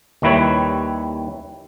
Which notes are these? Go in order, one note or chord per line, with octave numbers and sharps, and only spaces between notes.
D#2 D#3 G3 E4 B4 C#5